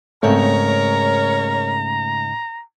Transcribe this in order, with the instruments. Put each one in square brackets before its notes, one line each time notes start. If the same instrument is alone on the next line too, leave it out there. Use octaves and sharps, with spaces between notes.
[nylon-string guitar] G#2 C#3 C4 [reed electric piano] A3 [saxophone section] A#4 C#5 [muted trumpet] A#5